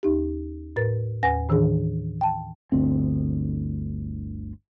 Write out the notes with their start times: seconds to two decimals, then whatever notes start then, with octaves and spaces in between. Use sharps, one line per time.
0.03 D#2 D#4 G4
0.76 A2 A#4 B4 A6
1.23 D#2 B4 F#5 G#5 A#6
1.49 A2 D#3 E3 D4 G#4
2.21 G5 A5
2.72 G1 D2 C4